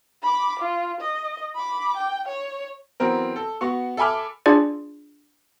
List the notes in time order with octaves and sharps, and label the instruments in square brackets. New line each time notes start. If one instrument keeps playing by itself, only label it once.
[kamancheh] B5 D6
F4
D#5
B5 D6
G5
C#5
[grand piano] E3 F#3 B3 C4 A#4
A4
B3 F#4 C#6
A4 E5 G#5 B5 D6 F6
[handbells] D4 F4 G#4 D5